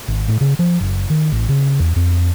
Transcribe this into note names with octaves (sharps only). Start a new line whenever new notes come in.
G#1
A2
C#3
F3
F#1
D#3
A1
C#3
E2
F2